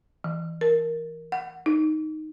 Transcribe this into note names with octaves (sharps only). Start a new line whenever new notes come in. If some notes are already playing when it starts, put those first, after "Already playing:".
E3
A#4
F#5
D#4